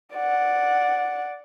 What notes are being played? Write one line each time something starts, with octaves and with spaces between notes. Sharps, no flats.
D5 F#5